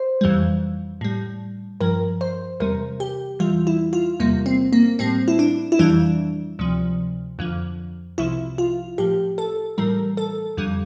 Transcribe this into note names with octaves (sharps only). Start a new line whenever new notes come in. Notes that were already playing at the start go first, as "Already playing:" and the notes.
Already playing: C5
F2 E3 G3
A2 G3
G2 F3 A#4
C5
E2 C3 G3 A#4
G4
E2 E3 G3 F4
E4
F4
E2 C3 G3 A#3
C4
A#3
A2 G3 C4
E4
D4
E4
F2 E3 G3 D4
D2 C3 F3
F2 D3 F3
C2 C3 F3 E4
F4
A2 F3 G4
A4
A2 E3 G3 A#4
A4
F2 D3 G3